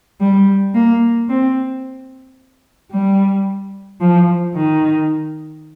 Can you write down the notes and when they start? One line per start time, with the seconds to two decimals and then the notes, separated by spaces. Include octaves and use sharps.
0.20 G3
0.75 A#3
1.29 C4
2.91 G3
4.01 F3
4.55 D#3